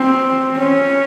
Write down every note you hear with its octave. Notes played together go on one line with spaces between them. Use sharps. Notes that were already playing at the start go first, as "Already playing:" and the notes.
Already playing: C4
C#4